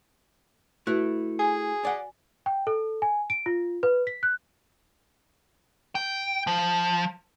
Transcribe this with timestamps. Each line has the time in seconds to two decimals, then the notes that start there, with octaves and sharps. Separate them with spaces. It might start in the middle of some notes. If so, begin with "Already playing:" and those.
0.87 A3 E4 F#4 B4
1.39 G#4 G#5
1.85 D5 F#5 G#5
2.46 G5
2.67 A4
3.02 G#5
3.30 D7
3.46 F4
3.83 B4
4.07 B6
4.23 F#6
5.95 G5
6.47 F3